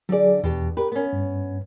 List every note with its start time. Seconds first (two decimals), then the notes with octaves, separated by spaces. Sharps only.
0.09 D3 F#3 G#4 D5
0.44 E2 B2 G4
0.77 G4 A#4 B4
0.92 B3 C#4
1.13 G2